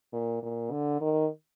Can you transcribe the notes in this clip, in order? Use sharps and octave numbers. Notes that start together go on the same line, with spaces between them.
A#2
A#2
D3
D#3